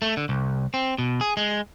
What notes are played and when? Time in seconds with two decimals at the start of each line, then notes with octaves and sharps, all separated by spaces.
0.02 A3
0.17 D3
0.29 C2
0.74 C4
0.98 B2
1.21 G#4
1.37 G#3